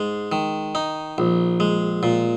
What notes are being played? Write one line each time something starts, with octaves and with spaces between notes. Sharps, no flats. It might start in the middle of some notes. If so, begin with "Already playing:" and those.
Already playing: G#2 G#3
D#3
D#4
A#1
G#3
A#2